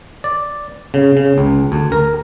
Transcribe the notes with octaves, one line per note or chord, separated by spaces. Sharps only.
D5
C#3
C#3
C#2
D2
A#4